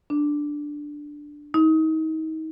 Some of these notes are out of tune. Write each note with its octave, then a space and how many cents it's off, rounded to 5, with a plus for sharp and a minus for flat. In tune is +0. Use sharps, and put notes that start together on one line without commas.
D4 +5
D#4 +30